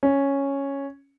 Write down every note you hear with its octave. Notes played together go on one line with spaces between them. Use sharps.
C#4